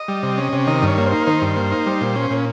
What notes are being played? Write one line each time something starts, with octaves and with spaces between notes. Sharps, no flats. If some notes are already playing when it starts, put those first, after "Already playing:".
Already playing: D#5
G3
C3
C#4
C3
D#3 D#5
G2
C#5
A#3
C5
D#4
D#3 C5
G2
A#3
D#4
G3
A#2
C#4
A#2